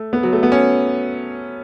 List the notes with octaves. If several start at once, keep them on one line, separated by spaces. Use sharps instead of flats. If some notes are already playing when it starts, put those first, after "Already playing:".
Already playing: A3
B3
F#3
A3
B3
C#4